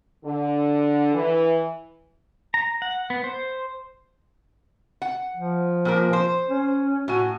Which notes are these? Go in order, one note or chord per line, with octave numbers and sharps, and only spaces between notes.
D3
E3
A#5
F#5
B3
C5
F#5
F3
A#2 A#3 A#4
C5
C#4
A2 F#4 G#5